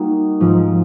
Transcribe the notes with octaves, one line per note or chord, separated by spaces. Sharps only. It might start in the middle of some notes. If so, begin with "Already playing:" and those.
Already playing: G3 A#3 D#4 F#4
G#2 F3 G#3